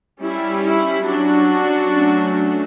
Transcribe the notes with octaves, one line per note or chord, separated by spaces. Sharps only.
G3 C#4 E4
E4
F#3 C#4 D4 F#4
F#3 A3 C#4